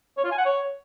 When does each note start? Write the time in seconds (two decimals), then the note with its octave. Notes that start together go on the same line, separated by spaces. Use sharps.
0.17 C#5
0.24 F4
0.31 G#5
0.38 F#5
0.45 C#5